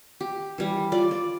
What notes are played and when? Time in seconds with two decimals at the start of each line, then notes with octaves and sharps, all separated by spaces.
0.21 G4
0.58 E3 G3
0.92 F4 D5
1.11 D5